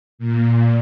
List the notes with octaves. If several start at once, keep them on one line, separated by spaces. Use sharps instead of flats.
A#2